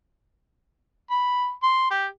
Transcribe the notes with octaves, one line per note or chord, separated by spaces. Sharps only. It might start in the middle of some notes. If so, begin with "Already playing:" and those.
B5
C6
G4